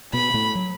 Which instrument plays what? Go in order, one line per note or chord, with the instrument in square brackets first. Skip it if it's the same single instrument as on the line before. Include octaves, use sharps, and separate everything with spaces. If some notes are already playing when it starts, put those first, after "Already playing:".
[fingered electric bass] B2 B3 [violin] B5
[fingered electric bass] A2 A3
F#3